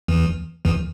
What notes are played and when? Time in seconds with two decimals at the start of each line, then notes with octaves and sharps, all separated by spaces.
0.08 E2 E3
0.65 E2 E3